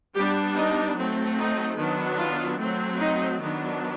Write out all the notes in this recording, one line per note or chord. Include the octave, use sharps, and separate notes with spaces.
G3 B3 D4 G4
D#4
F#3 A3 C4
D#4
D#3 F#3 B3 D4
F4
F#3 A3 C4
D#4
D#3 F#3 B3 D4